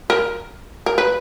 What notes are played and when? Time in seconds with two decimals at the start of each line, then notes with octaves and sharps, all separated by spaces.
0.10 A#4
0.86 A#4
0.98 B4